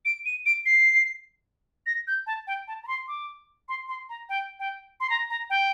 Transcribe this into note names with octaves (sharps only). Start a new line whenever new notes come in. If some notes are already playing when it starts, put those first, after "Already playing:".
D7
D#7
D7
C7
A#6
G6
A5
G5
A5
A#5
C6
D6
C6
C6
A#5
G5
G5
C6
A#5
A#5
G5